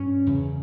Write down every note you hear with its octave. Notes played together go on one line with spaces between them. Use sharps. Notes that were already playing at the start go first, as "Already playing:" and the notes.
Already playing: G2 C#4
E2 C#3